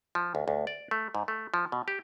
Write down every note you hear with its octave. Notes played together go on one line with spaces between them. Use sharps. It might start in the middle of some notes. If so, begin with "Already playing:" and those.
F3
D2
D2
D5
A3
G#2
A3
F3
B2
G4